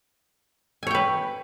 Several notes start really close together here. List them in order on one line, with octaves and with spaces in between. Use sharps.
G#5 C#5 G5 B4